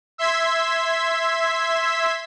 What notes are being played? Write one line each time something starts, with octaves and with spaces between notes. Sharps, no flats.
E5 C6 E6 G#6 B6